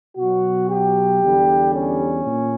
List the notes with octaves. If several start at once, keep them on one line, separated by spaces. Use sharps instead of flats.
B2 F#3 F#4
G4
E2 D3 G3
C#4
A#2